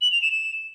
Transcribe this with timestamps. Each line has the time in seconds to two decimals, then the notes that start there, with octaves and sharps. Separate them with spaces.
0.01 F#7
0.12 F7
0.22 E7
0.32 E7